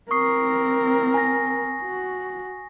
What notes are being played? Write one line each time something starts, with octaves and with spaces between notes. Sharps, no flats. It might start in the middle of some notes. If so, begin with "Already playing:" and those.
C4 A#4 C#6 D#6 C7
G#5 A#6
F#4